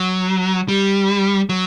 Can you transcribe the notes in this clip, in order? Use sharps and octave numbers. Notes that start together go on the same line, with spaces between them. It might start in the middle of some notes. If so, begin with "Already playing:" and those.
Already playing: F#3
G3
F#3